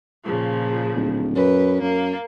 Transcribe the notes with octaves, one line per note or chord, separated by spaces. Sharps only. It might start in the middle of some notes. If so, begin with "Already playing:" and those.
A#2 C#3 F3
D1
F#2 B4
F#2 A#3